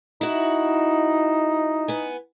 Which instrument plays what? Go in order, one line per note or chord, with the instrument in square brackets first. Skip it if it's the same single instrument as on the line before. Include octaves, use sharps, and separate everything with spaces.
[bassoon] D#4 [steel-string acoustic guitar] E4 F#4
[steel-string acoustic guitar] B3 G#5